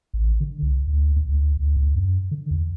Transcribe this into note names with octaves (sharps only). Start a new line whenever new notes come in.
A1
D3
C2
D2
D#2
D2
D2
D2
F#2
D3
E2